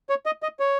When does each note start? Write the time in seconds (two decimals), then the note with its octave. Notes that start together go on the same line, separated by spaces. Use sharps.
0.09 C#5
0.26 D#5
0.43 D#5
0.60 C#5